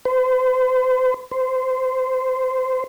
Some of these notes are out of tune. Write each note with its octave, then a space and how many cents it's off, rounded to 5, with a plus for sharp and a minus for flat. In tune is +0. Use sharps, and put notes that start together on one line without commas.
C5 -40
C5 -20